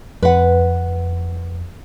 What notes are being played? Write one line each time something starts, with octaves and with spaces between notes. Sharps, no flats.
F2 B4 F#5